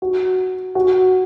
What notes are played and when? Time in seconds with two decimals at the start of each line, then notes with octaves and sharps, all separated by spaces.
0.02 F#4
0.75 F#4